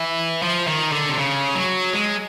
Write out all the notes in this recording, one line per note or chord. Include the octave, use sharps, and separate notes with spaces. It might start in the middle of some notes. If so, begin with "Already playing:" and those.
Already playing: E3
F3
D#3
D3
C3
C#3
F#3
G#3